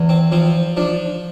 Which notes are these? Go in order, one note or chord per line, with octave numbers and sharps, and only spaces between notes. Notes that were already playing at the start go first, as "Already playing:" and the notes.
Already playing: E2
C4
F3 C4
F3 D4